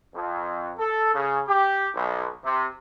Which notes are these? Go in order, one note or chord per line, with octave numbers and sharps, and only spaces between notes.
F2
A4
C#3
G4
B1
C3